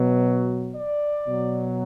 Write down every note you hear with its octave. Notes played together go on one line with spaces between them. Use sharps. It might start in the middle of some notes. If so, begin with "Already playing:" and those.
Already playing: B2 F#3
D5
B2 F#3